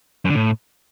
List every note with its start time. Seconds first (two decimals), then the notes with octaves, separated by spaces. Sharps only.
0.25 F#2
0.30 D3
0.35 A2